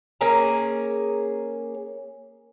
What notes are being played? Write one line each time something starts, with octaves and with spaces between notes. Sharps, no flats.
A#3 C#4 G#4 A#5